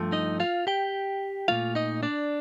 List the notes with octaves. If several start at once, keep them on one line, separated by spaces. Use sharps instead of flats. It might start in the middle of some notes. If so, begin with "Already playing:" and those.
Already playing: G2 F3 A3
D#4 D#5
F4 F5
G4 G5
A#2 F3 A3 F4 F5
D#4 D#5
D4 D5